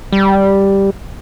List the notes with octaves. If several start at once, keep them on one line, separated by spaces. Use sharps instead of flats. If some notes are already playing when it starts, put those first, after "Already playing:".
G3